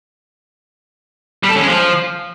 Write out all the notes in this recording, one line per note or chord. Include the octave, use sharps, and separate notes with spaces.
G3
A4
C#4
G#3
F3